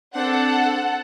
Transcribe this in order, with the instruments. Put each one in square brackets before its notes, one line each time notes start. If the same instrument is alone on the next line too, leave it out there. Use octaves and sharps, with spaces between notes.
[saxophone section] C4 D4 [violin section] A4 F#5